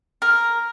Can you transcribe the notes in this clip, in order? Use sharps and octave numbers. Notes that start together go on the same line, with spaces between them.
A#4